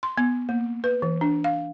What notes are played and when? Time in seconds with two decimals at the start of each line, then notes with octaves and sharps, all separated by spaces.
0.03 C6
0.18 B3
0.49 A#3
0.84 B4
1.02 E3
1.21 D4
1.44 F5